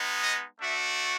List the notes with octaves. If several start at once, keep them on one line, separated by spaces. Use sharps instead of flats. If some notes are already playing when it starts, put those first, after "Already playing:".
Already playing: G#3 B3 D#4
D#5
A3 D4 F#4 E5